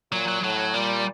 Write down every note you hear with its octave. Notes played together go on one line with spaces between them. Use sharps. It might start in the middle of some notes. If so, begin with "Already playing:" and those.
A#2 F#3
F#3
A2 F#3
A#2 G3